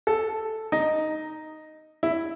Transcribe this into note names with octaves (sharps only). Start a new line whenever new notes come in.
A4
D#4
E4